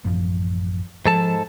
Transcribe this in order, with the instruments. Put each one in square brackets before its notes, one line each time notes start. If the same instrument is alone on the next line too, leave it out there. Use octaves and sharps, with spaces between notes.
[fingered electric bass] A1 F#2 F3
[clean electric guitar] G#2 A4 A5 [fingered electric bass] F3